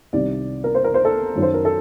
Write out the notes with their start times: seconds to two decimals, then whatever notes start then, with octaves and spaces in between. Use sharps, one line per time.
0.13 C2 C3 D#3 G3 D5
0.64 A#4
0.75 C5
0.84 A#4
0.94 C5
1.05 A4
1.35 F#2 D#3 F#3
1.42 C5
1.54 A#4
1.65 A4